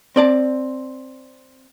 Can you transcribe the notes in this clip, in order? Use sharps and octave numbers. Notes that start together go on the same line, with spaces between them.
C4 D5 A5